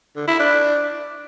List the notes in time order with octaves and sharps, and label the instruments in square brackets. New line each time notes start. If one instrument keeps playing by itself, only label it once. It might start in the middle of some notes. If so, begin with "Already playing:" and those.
[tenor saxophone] D3
E4
D4